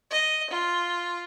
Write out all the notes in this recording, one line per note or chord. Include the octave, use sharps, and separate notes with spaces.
D#5
F4